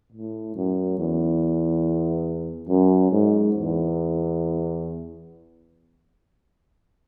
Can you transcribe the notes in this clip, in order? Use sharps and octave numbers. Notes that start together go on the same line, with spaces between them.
A2
F#2
E2
F#2
G#2
E2